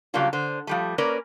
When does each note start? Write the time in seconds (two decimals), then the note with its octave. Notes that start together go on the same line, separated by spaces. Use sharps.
0.14 C#3 F#3 G3 A#3 D4 F4
0.33 D3 C5
0.67 F3 G3 A3
0.98 A#3 C#4 A#4 B4 D5